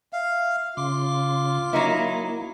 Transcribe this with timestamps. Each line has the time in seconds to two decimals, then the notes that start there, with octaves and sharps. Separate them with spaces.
0.13 E5 F5
0.77 C#3 F4 C6 D6
1.73 F#3 A#3 D#4 E4